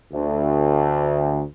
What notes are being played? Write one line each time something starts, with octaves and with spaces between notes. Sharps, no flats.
D2